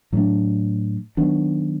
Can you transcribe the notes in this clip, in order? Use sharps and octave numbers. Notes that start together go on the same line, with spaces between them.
A2 F#3 A3 D4
D#3 F#3 B3 D4